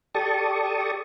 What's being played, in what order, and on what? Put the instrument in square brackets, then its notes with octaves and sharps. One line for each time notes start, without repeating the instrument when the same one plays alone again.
[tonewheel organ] G4 A4 D5 A5 C#6 D#6